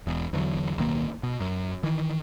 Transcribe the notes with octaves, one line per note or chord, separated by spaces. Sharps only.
E1 E2
E2 D3 F#3
D1 B1 D#3 A#3
B2
F#2
D#3 E3